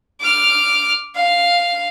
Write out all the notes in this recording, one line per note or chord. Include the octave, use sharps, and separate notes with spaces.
D6 F6
F5